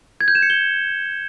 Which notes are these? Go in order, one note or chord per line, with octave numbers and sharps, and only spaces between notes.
G#6
G6
E7
C#7
G7